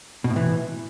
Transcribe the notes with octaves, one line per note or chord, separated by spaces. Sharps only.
B2
A2
E3